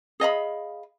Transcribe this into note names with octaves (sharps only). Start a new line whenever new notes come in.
G#4 D#5 F5 B5